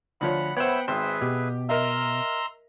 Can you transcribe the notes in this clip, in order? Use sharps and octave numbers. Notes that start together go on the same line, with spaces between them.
D2 F3 C#5 F#5 B5
B3 C5 C#5 E5 F#5 G5 B5
G#1 G#4 B4 C5 E5
B2 G4
A#4 D#5 E5 A#5 C6 E6